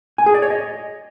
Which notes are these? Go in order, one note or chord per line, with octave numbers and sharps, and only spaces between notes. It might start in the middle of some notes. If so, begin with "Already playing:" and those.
G#5
G#4
D5
C#5
D#5